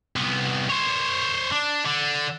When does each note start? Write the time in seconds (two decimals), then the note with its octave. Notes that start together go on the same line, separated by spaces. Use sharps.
0.16 C2 B3
0.69 C5 C#5
1.52 D4
1.85 D3